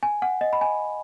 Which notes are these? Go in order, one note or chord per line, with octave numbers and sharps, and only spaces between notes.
G#5
F#5
D#5
B5
G#5